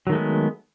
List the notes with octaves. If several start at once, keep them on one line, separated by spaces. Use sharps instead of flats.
D#3 F#3 G#3 A3 B3